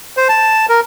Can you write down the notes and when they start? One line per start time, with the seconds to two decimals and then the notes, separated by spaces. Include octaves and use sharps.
0.17 C5
0.29 A5
0.69 A#4